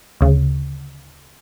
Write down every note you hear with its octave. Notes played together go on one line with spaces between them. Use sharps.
D2 C#3